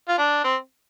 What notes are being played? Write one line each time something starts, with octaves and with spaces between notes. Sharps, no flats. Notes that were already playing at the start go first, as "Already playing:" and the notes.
F4
D4
C4